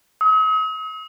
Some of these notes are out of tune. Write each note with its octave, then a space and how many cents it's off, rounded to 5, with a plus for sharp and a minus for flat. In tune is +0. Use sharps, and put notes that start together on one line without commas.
D#6 +45